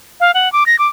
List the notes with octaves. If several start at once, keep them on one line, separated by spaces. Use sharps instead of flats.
F5
F#5
D6
A#6
D6